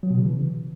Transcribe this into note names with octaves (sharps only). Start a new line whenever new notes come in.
F#3
B2
C#3
E3